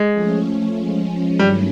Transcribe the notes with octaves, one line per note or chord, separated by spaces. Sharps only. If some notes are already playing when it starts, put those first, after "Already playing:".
Already playing: G#3
F3 A3 C#4
F3 G#3 C#4
G2 D#3 F#3 G3 A3 C#4